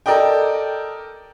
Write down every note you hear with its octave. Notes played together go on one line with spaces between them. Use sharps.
A4 A#4 D5 D#5 G5